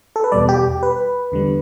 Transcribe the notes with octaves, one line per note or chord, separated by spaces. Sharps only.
A4
B4
E2 B2 G3 D5
G4
B4
E2 D3 G3